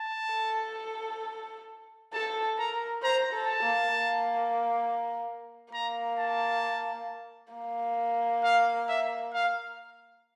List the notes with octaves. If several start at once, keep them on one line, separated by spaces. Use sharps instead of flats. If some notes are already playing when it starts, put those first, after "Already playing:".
Already playing: A5
A4
A4 A5
A#4 A#5
C5 A#5
A4
A5
A#3
A#3
A#3 A#5
A5
A#3
F5
E5
F5